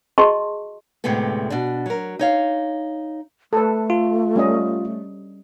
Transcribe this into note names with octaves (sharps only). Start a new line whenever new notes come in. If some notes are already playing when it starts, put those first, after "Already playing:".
F#4 G#4 D#5 A5 C6 C#6
D2 A2 C3 G#3 B3 A4
B2 D4
F#3 A#4
D#4 C#5 F5
A3 A4 B4
F4
G3 C#4 D#5